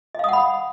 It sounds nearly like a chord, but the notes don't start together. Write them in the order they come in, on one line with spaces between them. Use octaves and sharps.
D#5 F5 D#6 F#5 B5